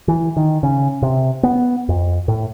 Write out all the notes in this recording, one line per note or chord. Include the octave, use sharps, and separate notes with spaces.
E3
D#3
C#3
C3
B3
F2
A2